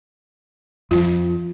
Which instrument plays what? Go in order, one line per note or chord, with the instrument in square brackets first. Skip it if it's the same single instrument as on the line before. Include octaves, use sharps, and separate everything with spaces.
[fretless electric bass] F2 F3 [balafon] F4